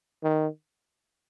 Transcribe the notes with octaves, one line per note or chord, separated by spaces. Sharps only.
D#3